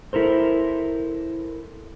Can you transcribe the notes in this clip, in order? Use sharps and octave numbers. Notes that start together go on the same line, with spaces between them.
E4 A4 A#4 C5